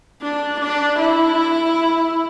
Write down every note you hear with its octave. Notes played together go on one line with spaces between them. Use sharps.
D4
D4
E4